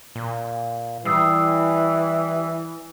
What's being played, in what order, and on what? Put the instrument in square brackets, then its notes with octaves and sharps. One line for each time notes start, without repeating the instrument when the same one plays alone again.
[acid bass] A#2
[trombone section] E3 [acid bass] G3 [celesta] D#6 E6 C7